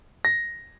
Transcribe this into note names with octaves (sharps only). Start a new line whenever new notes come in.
A#6